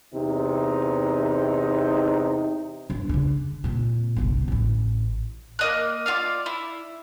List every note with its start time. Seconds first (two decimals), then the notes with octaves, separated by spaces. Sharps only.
0.13 E2 C3 D#4
2.90 G2
3.09 C#3 D4
3.64 A#2 C4
4.16 G1 C2
4.48 A1 E3
5.59 A#3 D#5 F#6
6.06 F4 F#4 D5 F5
6.46 E4